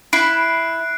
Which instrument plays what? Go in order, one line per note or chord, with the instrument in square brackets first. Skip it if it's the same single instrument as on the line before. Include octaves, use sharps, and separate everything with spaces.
[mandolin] E4 [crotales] F#6 C7 D7